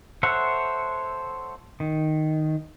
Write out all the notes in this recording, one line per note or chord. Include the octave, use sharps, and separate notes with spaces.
A4 C5 C#5 E5 F#5
D#3